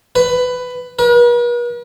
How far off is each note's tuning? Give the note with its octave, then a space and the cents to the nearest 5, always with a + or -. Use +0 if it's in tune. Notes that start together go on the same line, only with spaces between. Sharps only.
B4 +15
B4 -45